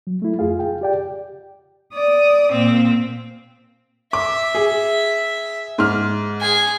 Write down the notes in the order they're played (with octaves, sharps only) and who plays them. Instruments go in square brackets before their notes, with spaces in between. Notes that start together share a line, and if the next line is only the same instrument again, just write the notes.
[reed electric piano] F#3
A3 E4
F2 F4 G#4 F5
G5
G4 D5 G5
[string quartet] D5 D#6
A#2 C4
[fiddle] E5 [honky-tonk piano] D6
[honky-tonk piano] G#4
G#2 F6
[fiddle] G#4 G#5